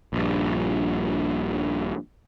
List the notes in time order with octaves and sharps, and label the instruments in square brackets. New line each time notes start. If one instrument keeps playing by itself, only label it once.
[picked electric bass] A#1 G2